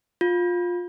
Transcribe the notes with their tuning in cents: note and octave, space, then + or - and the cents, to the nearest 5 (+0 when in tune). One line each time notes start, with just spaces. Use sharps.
F4 +15